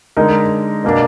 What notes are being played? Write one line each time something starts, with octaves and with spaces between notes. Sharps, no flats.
D3 G#3 D#4 A#4
B2 A#3 D4